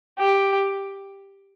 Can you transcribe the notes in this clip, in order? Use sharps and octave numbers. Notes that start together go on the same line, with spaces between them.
G4